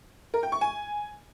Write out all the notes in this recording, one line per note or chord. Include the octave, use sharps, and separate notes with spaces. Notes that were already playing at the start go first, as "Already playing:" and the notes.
A#4
G5
C#6
G#5